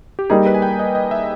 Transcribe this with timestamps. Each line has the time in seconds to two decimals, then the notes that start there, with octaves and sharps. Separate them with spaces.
0.19 G4
0.30 G3 A#3 D#4 G#4
0.47 B4
0.54 G#5
0.62 G5
0.79 D#5
0.95 D#5
1.11 E5